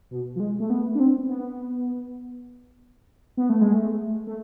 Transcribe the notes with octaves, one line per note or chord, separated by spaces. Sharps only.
B2
F3
G#3
A3
B3
D4
C4
B3
B3
A3
G#3
A3
A3